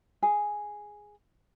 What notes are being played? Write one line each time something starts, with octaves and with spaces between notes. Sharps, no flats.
G#4